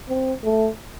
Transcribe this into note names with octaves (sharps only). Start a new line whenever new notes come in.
C4
A3